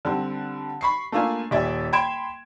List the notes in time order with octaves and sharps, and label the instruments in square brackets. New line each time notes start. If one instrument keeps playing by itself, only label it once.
[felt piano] D3 G3 C4
B5 C#6 C7
A3 A#3 D4 F4 G#5
D#1 G4 D5 E5 G#5
G5 B5 C6 G#6 D7 E7